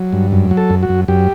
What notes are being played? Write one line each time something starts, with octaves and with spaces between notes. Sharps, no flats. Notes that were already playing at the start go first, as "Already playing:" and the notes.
Already playing: F#3
G2
F#2
F#3
A4
F#2
F#4
F#2
F#2 G4